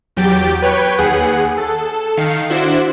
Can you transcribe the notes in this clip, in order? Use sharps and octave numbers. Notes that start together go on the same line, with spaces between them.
E2 F#3 G4 G5 A6
B4 C#5 G5
D#2 G#4 F#5
A4
D#3 F5 C7 C#7
D4 E4 F#4 C5